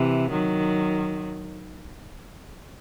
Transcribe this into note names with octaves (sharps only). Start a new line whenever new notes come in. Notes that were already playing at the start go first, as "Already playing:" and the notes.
Already playing: C3 E3
D#3 F#3